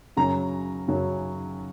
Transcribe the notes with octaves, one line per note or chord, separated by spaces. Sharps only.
F#2 C#3 F#3 A#5
F#2 C#3 F#3